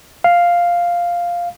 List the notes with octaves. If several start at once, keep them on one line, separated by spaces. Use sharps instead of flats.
F5